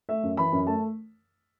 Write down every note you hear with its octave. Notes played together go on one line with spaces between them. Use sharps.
A3 E5
F#2
E3 B5
F#2
A3 A5